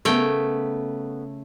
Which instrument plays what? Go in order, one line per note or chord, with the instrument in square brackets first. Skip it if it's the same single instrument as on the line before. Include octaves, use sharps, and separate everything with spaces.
[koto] C#3 A3 G5 [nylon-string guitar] B3 A4 A#4